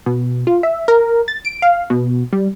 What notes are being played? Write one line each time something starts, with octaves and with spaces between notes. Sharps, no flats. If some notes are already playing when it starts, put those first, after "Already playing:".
B2
F4
E5
A#4
A6
D7
F5
B2
G3